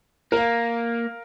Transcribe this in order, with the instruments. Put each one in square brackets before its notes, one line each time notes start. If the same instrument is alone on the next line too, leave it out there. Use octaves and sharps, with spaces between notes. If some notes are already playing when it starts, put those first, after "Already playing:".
[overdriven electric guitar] A#3 [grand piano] A#4 F5